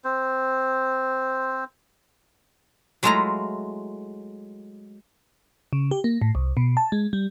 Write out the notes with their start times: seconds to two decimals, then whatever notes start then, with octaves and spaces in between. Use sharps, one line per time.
0.04 C4 C5
3.03 F#3 G#3 A3 E4 F4 A#5
5.73 C#3
5.91 G4
6.04 A#3
6.22 A2
6.35 C2
6.57 B2
6.77 A5
6.92 G#3
7.13 G3